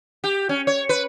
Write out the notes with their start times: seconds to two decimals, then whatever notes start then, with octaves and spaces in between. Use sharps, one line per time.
0.24 G4
0.49 C#4
0.67 C#5
0.89 B4